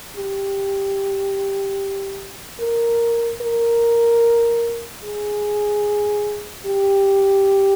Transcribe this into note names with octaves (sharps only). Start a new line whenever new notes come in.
G4
A#4
A#4
G#4
G4